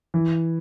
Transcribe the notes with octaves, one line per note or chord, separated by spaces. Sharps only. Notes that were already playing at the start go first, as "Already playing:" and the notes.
E3